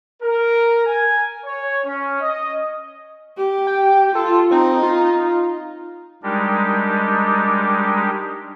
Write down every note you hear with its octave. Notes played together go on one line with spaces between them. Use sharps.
A#4
G#5
C#5
C#4
D#5
G4
G5
F4 A4
C4 D#4
F4
G3 G#3 D4 D#4 G4 A#4